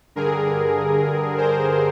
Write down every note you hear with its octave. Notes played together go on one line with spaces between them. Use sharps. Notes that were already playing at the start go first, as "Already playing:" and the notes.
G2 D3 G#4 A#4
A#4 C5